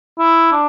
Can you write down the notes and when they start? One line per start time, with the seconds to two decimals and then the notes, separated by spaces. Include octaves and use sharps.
0.19 E4
0.52 D4